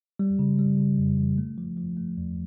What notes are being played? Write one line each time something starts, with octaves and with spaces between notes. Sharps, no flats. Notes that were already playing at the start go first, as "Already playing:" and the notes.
G3
C#3
G3
C#3
F2
E3
A3
F3
F3
A3
E2